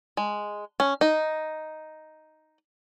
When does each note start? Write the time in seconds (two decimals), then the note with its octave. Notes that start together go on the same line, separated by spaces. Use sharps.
0.17 G#3
0.80 C#4
1.01 D#4